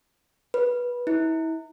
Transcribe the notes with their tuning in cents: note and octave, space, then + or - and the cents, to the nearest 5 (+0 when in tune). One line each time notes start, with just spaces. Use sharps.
B4 -15
E4 -35